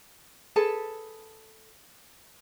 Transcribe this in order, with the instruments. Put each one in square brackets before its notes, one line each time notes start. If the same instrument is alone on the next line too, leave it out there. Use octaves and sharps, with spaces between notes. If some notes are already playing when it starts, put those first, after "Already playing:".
[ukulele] G#4 A4 B4 A5